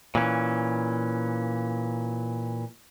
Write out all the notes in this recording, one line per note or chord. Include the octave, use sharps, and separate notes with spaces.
A#2 E3 C#4